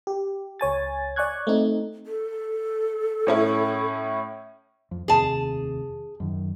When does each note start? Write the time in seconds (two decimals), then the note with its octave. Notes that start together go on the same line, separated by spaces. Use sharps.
0.07 G4
0.60 C#2 C#5 G#5 A6
1.16 D5 G#5 C#6 F#6 G#6
1.47 A3 C4 D#4
2.06 A4
3.27 A2 C#4 E4
4.91 F2
5.08 F1 D#2 C3 G#4 A5
6.20 F#2 D#3